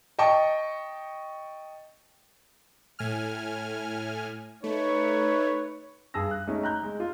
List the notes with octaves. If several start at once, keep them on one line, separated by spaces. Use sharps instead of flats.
D#5 G5 A5 C#6
A2 G#5 F6
A3 D#4 B4 C#5
G2 G#4 A5 E6 A#6
F#6
G#3 A3 C#4 D#4
A#5 F#6 G6
G#3
F4